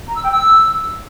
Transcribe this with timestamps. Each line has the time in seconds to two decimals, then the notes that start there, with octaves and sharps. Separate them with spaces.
0.07 A#5
0.15 E6
0.23 G5
0.31 E6